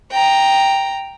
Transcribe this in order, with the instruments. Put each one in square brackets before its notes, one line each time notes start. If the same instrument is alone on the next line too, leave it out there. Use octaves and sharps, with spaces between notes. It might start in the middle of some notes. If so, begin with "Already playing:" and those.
[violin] G5 A#5